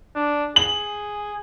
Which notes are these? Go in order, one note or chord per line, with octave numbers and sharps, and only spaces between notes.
D4
G#4 F#7